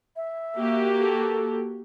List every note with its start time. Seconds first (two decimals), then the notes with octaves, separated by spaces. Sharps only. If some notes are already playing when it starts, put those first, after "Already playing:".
0.16 E5
0.55 A#3 F#4 G4
1.00 A4